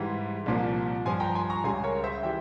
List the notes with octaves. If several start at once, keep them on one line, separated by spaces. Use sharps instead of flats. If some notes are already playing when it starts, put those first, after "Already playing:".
Already playing: G#2 E3 G3 C6
C2 A#2 F3
G2 F3 G#5 C6
G5 A#5
G#5 C6
A#5 C#6
C#2 C#3 G3 G#5 C6
A#4 C#5
C5 E5
E3 G3 E5 G5